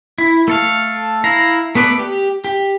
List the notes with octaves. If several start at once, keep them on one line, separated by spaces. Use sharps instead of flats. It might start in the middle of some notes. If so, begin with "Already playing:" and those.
E4
A3 A4 F5
E4 F5 A#5
A3 B3 B4 D5
G4
G4